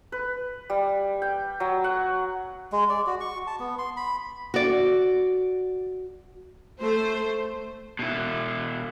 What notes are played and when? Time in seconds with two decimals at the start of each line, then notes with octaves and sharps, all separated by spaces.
0.12 B4
0.70 G3
1.22 G5
1.60 F#3
1.84 F#5
2.72 G#3
2.89 D5
3.06 F#4
3.20 C#6
3.47 A5
3.59 B3
3.78 C6
3.97 B5
4.54 F#4 D5
6.79 A3 C5
7.99 B2 E4